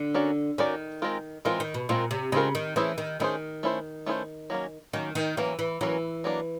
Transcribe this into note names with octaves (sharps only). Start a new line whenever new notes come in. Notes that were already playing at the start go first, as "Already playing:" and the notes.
Already playing: D3
C#4 F#4 A#4 D5
D#3 C#4 F#4 A#4 D5
G#3 C4 F4 A#4
E3 G#3 C4 F4 A#4
D#3
B2
A#2 G#3 C4 F4 A#4
C3
C#3 G#3 C4 F4 A#4
D#3
E3 A3 C#4 E4 G#4 C5
D#3
D#3 A3 C#4 E4 G#4 C5
A3 C#4 E4 G#4 C5
A3 C#4 E4 G#4 C5
F#3 A#3 C#4
D#3 F#3 A#3 C#4
D#3
E3 F#3 A#3 C#4
E3
E3 F#3 A#3 C#4
F#3 A#3 D4